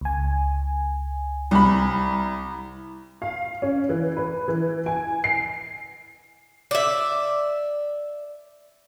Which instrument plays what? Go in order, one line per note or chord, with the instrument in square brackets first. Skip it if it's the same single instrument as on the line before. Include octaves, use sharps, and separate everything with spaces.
[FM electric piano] C#2 G#5
[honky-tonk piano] C2 B5
F5
C#4
E3
B4
E3
G#5
C7
[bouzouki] D5 E5